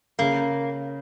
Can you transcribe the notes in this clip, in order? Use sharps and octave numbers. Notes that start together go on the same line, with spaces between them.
C#3 A#3